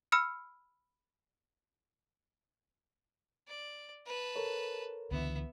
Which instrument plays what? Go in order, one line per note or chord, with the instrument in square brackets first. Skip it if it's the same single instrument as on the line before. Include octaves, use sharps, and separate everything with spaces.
[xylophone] B5 E6 F6 C#7
[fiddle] D5
B4 A5
[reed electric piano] A4 A#4 C#5
[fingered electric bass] C#2 D3 E3 [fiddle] B3 E5